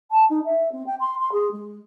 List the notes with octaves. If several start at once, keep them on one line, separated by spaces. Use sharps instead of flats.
A5
D#4
E5
C4
G5
C6
C6
G#4
G#3